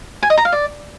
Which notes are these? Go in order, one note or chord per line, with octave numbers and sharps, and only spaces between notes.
G#5
D#5
A#5
F5
D5